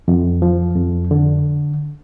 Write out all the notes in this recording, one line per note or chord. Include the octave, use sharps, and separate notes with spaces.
F2
F3
F2
D3